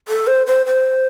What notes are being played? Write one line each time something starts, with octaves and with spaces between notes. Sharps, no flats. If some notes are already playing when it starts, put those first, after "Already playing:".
A4
C5
C5
C5